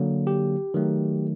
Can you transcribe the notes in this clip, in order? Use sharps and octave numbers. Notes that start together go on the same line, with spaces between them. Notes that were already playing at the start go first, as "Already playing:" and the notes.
Already playing: D3 F#3 A#3
G4
D#3 F#3 A3